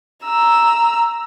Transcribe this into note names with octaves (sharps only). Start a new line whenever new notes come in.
A#5 E6